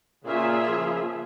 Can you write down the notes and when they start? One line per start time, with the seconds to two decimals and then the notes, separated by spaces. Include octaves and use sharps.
0.25 A#2 C#3 A#3 F4 G#4 E5
0.68 C#3 F3